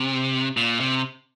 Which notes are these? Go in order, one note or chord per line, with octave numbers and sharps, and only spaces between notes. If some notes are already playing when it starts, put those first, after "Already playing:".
Already playing: C3
A#2
C3